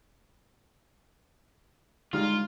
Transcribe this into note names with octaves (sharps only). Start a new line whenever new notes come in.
D3 G3 G#3 D#4 F4 F6